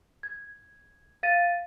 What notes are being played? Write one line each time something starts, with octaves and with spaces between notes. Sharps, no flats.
G#6
F5 A6 D#7